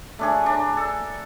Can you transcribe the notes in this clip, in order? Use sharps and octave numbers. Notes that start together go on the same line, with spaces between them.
A3 D4 G#4
D4 A#5
A4